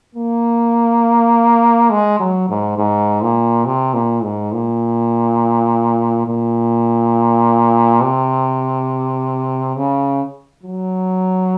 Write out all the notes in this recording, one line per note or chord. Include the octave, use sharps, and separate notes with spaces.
A#3
G#3
F#3
G#2
G#2
A#2
C3
A#2
G#2
A#2
A#2
C3
C#3
F#3